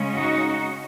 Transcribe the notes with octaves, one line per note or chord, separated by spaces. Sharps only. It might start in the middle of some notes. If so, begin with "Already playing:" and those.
Already playing: C#3 G#3 C#4
D#4 F#4